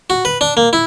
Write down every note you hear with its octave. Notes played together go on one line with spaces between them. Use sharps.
F#4
B4
D4
A#3
E4